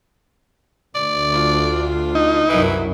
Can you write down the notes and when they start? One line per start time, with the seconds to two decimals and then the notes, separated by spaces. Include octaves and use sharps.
0.95 D2 D5
1.33 D4 F4
2.15 D#4
2.49 C2 F#2 E3 F#3 E4